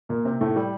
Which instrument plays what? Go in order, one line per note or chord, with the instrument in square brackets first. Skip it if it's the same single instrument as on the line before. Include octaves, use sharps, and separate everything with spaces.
[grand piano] A#2 A#3
C3 C4
A2 A3
G3